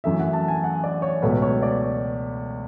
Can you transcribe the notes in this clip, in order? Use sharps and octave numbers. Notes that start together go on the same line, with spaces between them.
F#2 E3 A3 E5
F#5
A5
G#5
F#5
D5
C#5
C#2 B2 F#3 A3 B4
C#5
D5